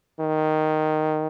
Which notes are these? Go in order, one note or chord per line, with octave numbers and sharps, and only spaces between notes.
D#3